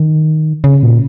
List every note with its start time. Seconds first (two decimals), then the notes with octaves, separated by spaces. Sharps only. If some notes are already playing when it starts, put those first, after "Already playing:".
Already playing: D#3
0.64 C#3
0.83 A#2